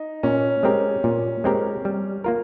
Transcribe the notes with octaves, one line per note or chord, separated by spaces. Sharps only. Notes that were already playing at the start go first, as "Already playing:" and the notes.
Already playing: D#4
A#2 C#4
G#3 C4 G4 A#4
A#2
G#3 C4 G4 A#4
G3
A#3 F4 A#4